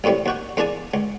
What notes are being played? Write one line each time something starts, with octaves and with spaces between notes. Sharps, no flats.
A1 F#2 A2 C3 G3
D#2 F#4 G5
E2 A#3 D4 G#4 A5 D#6
C#2